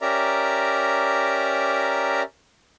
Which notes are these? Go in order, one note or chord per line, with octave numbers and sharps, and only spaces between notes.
C#4 G4 A#4 D5 E5 A#5